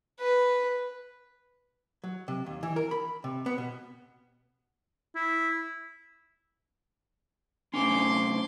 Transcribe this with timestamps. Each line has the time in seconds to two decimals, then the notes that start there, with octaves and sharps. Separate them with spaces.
0.19 B4
2.04 F#3
2.28 C3
2.46 D#2
2.63 E3
2.76 A#4
2.91 B5
3.24 C3
3.46 B3
3.58 B2
5.15 E4
7.74 A2 C3 C#4 C6 D6